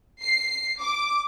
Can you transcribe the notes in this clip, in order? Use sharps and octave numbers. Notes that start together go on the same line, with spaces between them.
C7
D6